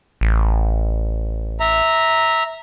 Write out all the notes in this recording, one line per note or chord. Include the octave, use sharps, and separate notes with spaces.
A1
E5 A#5